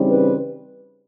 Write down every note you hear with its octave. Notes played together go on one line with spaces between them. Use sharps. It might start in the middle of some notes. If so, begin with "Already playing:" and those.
Already playing: C#3 E3 G3 C4 D#4
B4